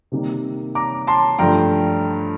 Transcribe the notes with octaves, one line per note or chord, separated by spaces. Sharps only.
C3 D#3 G3 A#3
A#5 D6
A5 C6
G2 F3 A3 G5 A#5